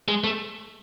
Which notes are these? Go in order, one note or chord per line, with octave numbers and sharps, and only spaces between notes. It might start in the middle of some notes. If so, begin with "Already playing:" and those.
G#3
A3